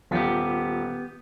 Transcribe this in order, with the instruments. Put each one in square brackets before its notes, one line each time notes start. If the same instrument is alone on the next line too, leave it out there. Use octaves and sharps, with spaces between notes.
[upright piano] D#1 F4 B6 [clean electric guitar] B3 G4